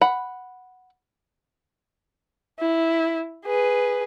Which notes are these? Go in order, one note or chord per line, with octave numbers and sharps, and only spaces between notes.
F#5 B5
E4
G#4 B4